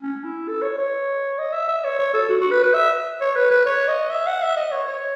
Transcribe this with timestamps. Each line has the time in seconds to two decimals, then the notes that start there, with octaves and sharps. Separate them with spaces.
0.02 C#4
0.24 E4
0.48 A4
0.62 C#5
0.78 C#5
1.38 D#5
1.53 E5
1.68 E5
1.84 C#5
1.99 C#5
2.14 A4
2.29 F#4
2.41 F#4
2.51 B4
2.63 B4
2.74 E5
3.21 C#5
3.36 B4
3.50 B4
3.66 C#5
3.88 D#5
4.10 E5
4.27 F#5
4.42 E5
4.56 D#5
4.71 C#5
4.87 C#5